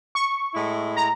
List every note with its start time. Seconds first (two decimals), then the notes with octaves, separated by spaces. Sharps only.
0.15 C#6
0.55 A2 G#3 E4
0.97 A#5